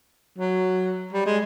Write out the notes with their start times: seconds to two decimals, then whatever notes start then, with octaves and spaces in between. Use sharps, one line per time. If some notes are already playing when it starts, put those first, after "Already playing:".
0.38 F#3
1.13 G3
1.26 G#3